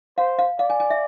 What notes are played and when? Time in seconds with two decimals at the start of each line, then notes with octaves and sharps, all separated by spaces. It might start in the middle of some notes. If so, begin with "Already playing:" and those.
0.18 C5 F5
0.39 F5
0.59 D5 F5
0.70 G#5
0.80 G#5
0.90 E5